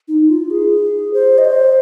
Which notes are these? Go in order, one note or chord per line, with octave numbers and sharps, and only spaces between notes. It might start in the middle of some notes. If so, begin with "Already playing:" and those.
D#4
F4
G#4
C5
D#5
C5